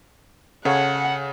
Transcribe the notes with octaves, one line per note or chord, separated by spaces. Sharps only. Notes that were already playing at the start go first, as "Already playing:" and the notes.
C#3 A4 C#5 F5 F#5